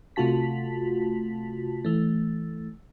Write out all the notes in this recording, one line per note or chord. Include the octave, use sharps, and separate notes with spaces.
C3 A3 F4 F#4 A5 B6
E3 A3